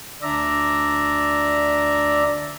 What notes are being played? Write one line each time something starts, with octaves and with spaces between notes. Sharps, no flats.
D2 D4 D5 E5 A#5